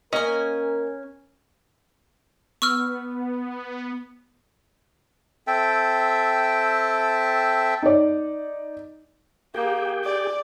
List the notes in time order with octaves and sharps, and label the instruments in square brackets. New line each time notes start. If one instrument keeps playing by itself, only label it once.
[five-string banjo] A#3 D#5 [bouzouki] C#4 G#5 [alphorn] A#4
[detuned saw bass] B3 [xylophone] C#6 E6 F6
[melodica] C4 A4 E5 G5
[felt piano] D#4 D5
[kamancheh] A#3 [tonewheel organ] G4 G#4 G5
[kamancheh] D5